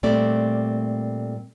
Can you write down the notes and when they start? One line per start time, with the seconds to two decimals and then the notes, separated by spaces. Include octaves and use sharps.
0.03 A#2 G3 A3 C4 D5